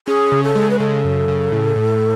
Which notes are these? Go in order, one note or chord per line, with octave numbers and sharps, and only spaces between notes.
C#4 G#4
C#3
A4
G#3
B4
C#3 A4
F#2
C#3
A2
A2